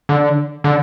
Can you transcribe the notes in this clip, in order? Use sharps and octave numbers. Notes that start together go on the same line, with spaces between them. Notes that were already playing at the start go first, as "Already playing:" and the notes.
D3
D3